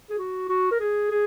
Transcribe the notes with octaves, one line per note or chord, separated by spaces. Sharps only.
G#4
F#4
F#4
A#4
G#4
G#4